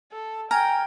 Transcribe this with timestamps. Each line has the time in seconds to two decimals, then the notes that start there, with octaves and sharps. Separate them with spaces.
0.12 A4
0.51 G5 G#5 A#5 F6